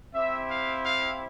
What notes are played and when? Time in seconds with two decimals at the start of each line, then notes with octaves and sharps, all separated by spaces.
0.14 C4 E4 G4 E5
0.49 F5
0.84 F5